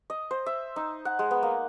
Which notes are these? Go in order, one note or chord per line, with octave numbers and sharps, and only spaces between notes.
D#5
C5
E5
D#4
F#5
G#3
B3
A#3